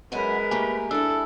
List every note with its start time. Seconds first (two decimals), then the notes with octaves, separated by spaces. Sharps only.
0.12 F#2 G#3 A#4 B4 F#5 G#5
0.51 A3 A#3 G4 G#5
0.91 D4 E4 A4 E6